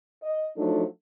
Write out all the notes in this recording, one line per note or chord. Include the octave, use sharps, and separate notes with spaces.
D#5
F3 F#3 A3 D4 D#4 A4